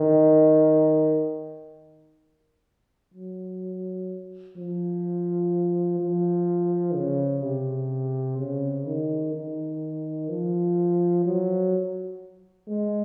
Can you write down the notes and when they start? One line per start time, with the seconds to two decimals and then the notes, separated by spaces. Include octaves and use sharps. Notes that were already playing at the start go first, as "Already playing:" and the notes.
Already playing: D#3
3.14 F#3
4.57 F3
6.00 F3
6.95 C#3
7.43 C3
8.38 C#3
8.86 D#3
9.34 D#3
10.29 F3
11.25 F#3
12.68 G#3